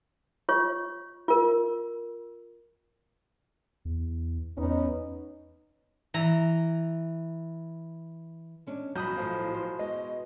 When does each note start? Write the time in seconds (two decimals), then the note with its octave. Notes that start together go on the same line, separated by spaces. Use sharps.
0.49 F4 C#5 C#6
1.28 F4 A#4
3.85 E2
4.58 E2 B3 C#4 D#4
6.14 E3 A#5
8.67 G#3 C#4 D4
8.96 B1 B2 F#3 F#4 A#5 B5 D#6 G6
9.17 A2 E3 F3
9.54 C5
9.79 B2 G#3 D#5